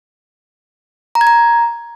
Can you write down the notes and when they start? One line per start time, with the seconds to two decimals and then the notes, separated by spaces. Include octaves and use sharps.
1.15 A#5
1.21 G#6
1.27 A#5